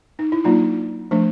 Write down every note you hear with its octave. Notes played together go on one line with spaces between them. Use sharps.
D#4
E4
F#3 A#3 D4 D#4 F4
F3 A3 D4